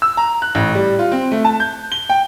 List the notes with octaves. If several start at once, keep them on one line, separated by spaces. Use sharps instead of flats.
E6
A#5
F#6
A1
G3
F4
C4
A3
A5
G6
G7
G5